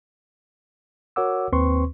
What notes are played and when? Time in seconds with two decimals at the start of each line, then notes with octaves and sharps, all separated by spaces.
1.16 F#4 A#4 C#5 F#5 D6 E6
1.53 D#2 C4 B4 C6 C#6